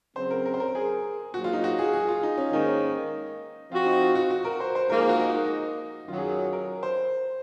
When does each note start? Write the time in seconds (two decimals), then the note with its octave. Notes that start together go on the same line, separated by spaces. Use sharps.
0.16 C#3 F#3 C4 C5
0.31 A#4
0.46 A#4
0.54 C5
0.60 A#4
0.75 G#4
1.34 G#2 F#3 A#3 F#4
1.44 F4
1.53 D#4
1.64 F#4
1.79 G#4
1.93 G#4
2.08 F4
2.23 D#4
2.38 C#4
2.52 G#2 D#3 A#3 C#4 D#4
3.71 F3 C4 F4 F#4
3.86 D#4
4.01 F4
4.15 F#4
4.31 F#4
4.45 A#4
4.60 C5
4.75 C5
4.90 G#2 F3 A#3 A#4
4.99 G#4
5.09 F#4
5.20 D#4
5.34 D#4
6.08 F#2 D#3 F#3 F4
6.18 G#4
6.53 A#4
6.83 C5